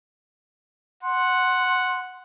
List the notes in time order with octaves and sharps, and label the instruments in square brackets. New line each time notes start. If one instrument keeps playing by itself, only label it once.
[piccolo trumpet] F#5 [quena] C6